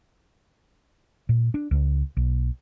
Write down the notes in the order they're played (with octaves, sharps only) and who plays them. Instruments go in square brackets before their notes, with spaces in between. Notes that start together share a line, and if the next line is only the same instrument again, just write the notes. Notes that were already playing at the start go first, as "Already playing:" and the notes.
[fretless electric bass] A#2
D4
C#2
B1